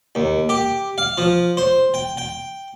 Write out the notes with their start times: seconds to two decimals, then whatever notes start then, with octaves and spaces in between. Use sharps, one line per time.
0.15 D#2
0.49 G4
0.98 F5
1.18 F3
1.57 C5
1.94 G5
2.17 G5